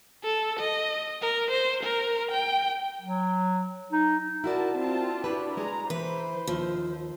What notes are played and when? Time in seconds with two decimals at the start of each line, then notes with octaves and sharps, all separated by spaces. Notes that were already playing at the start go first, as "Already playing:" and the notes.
0.23 A4
0.59 D#5
1.21 A#4
1.51 C5
1.83 A#4
2.31 G5
3.01 F#3
3.92 D#4
4.44 E4 F#4 A#4 D5 A5
4.76 C4 F4 A5
5.24 D4 E4 F#4 G4 B4
5.57 G#3 G#4 A#5
5.90 E3 B4 C5
6.47 D#2 F3